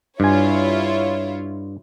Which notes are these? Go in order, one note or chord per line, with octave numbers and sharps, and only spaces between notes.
G2 E4 F4 C#5 G#5